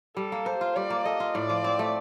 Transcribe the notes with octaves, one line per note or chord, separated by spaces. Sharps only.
G3 A4
A#3
A4 C5
F4
G3 D5
A#3
A4 D#5
F4
A2 D5
F3
C4
A3